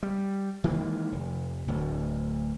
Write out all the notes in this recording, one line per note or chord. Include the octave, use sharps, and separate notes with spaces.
G3
D#3 E3 G#3 A#3
F1
D1 D2